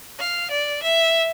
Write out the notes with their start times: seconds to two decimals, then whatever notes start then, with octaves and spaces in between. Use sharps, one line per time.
0.20 F5
0.51 D5
0.83 E5